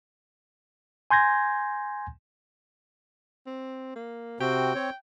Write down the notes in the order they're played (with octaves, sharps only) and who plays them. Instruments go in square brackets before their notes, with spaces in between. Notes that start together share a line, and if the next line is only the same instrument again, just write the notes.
[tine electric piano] G#5 C6 G6 G#6 A#6
[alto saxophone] C4
A#3
[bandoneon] C3 C4 F#4 [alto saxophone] G5
[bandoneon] C4 C#5